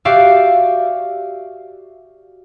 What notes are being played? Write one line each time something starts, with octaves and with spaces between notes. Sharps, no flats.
F#4 G4 D5 E5 F5